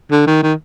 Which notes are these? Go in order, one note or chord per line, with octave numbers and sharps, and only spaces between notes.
D3
D#3
D#3